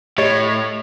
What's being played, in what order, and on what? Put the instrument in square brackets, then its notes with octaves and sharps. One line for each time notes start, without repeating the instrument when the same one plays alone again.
[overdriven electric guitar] A2 [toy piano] G4 D#5 C#6 [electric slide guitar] C#5